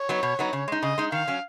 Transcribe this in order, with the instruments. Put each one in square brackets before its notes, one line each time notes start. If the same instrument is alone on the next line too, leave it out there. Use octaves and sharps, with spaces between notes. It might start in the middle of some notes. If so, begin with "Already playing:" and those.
Already playing: [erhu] C#5
[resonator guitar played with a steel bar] F#3 B3 D#4
B2
F#3 B3 D#4
C#3
G#3 D#4
[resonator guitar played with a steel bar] C#3 [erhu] D#5
[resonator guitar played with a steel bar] G#3 D#4
[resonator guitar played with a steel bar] D#3 [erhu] F5
[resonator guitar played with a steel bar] F#3 C#4